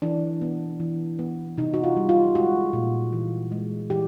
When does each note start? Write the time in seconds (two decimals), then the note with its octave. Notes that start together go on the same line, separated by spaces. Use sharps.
0.02 E3 D4
0.41 B3
0.80 E3
1.19 B3
1.57 C3 D#4
1.74 F#4
1.84 F4
1.97 G3
2.09 F4
2.35 G#3 F#4
2.73 A#2
3.13 E3
3.52 G#3
3.90 E3 G4